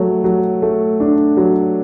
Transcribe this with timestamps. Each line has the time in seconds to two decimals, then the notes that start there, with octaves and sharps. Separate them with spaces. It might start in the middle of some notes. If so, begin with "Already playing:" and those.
Already playing: F#3 A3
0.24 F#3
0.62 A3
1.00 D4
1.37 F#3